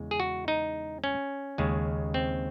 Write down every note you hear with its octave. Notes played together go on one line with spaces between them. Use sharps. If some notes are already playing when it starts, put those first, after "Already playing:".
Already playing: E2 C#3 G#3
G#4
F#4
D#4
C#4
D#2 C#3 G#3
C4